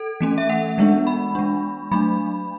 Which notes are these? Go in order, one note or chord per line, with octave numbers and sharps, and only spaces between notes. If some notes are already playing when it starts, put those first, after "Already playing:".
Already playing: A4
E3 A3 C#4
E5
F#5
E3 G#3 B3 D4
B5
G#3 D4
F#3 A3 D4 B5